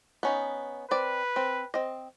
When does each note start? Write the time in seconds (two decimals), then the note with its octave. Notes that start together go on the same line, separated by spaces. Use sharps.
0.23 B3 C#4 D#4
0.91 C4 B4 D5
1.36 C4
1.74 C4 D#5